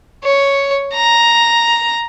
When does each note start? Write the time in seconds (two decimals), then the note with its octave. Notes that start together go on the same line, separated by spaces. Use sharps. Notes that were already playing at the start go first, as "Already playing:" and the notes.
0.24 C#5
0.94 A#5